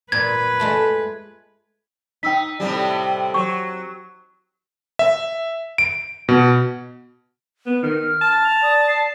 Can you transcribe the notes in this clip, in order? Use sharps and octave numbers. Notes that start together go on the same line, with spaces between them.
A#2 B4 G#6
G#3 A3 A5
D#4 G5 E6 B6
A2 C3 G3
F#3 C#6
E5
D7
B2
B3
D#3 F6
A5
F7
D5 D#6
C7